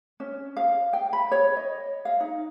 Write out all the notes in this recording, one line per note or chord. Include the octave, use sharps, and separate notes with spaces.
C#4
F5
G5
B5
C#5
D#5
F5
D#4